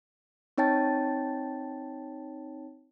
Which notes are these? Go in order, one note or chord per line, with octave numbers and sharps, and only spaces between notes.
C4 D#4 C#5 G5 A5 A6